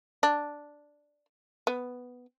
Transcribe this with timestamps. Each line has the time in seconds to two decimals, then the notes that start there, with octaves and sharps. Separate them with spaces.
0.23 D4
1.67 B3